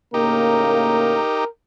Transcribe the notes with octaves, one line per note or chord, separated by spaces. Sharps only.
A2 C#3 A#3 D#4 G4 A#4